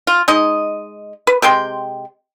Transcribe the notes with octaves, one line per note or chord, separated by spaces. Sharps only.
F4
G#3 D#4 D#5
B4
C3 G#3 G5 C6